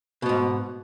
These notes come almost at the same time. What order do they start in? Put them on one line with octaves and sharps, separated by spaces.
B2 B3 G#2